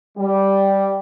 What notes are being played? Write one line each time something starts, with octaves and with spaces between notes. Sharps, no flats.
G3